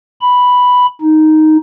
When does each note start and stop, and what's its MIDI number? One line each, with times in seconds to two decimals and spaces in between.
0.21 0.86 83
1.01 1.57 63